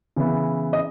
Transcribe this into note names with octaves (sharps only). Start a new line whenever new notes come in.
C#3 E3 B3 E4
D#5